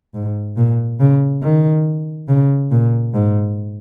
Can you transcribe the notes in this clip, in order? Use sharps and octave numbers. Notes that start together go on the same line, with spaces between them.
G#2
A#2
C#3
D#3
C#3
A#2
G#2